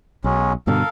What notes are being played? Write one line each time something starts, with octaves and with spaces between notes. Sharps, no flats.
B1 F#3 G#3 C#4
G2 B2 D3 A4 A#4 F5